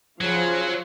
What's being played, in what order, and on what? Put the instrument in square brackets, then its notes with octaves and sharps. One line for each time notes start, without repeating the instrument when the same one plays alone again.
[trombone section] C#3 [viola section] F3 C5 F5 [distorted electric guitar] F#3